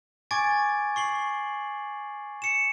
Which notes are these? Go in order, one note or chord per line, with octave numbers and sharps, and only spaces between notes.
G#5 C#6 D6 G#6 A6 D7
C#6 C7 F#7
C#7 E7